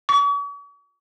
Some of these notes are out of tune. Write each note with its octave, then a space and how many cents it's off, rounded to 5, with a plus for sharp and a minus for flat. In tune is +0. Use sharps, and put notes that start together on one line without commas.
C#6 +45